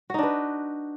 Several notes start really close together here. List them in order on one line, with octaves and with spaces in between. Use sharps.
F#4 D#4 D4 B4